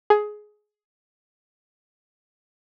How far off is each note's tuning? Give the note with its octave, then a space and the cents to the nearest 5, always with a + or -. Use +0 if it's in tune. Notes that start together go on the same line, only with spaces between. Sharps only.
G#4 +15